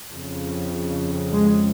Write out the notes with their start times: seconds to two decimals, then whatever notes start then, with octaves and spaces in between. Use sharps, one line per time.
0.13 F2 C#3
1.32 G#3